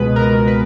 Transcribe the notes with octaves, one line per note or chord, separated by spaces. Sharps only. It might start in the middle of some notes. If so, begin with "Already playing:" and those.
Already playing: C#2 B2 G#3 B3 B4
A#4
B4